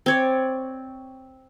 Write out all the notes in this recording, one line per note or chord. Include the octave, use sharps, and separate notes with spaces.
C4 C#5 D5